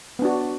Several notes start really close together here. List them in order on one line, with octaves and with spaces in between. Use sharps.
B3 D4 F#4